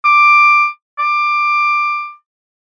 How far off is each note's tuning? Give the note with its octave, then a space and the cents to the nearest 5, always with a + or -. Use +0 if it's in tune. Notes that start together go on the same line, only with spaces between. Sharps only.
D6 +10
D6 +15